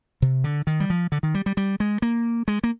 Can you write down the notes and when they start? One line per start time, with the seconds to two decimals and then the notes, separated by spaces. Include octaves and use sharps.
0.22 C3
0.44 D3
0.67 D#3
0.80 G3
0.90 F3
1.12 D3
1.23 D#3
1.34 G3
1.46 G3
1.57 G3
1.80 G#3
2.02 A#3
2.48 G#3
2.64 A#3